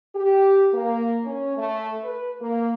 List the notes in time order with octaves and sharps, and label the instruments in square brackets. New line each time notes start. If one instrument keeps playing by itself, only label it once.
[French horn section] G4
A#3
C#4
A3
B4
A#3